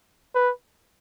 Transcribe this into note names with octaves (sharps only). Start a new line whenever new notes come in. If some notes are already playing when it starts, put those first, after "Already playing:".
B4